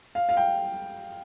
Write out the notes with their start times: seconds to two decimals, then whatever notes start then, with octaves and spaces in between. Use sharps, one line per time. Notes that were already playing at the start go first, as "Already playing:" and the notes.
0.15 F5
0.29 F5
0.37 G5